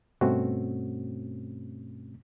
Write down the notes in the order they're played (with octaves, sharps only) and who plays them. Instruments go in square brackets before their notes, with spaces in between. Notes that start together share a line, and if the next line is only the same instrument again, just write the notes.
[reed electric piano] G2 B2 A3 C4 C#4 F#4